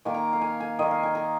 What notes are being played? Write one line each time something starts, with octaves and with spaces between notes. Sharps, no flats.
D#3 A#3 G#5
A#5
F5
G#5
G#5
D#3 A#3 D#5
F5
G#5
A#5